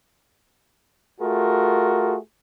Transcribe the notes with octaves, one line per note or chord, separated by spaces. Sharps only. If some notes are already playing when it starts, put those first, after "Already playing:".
A3 F4 F#4 G#4 A#4